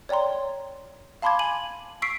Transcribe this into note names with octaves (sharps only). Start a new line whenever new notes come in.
C#5 D5 G5 A#5 C6
F5 A5 B5 C6 D6 G#6
G#5 D#7 F#7
C#6 E6 B6 C7 D7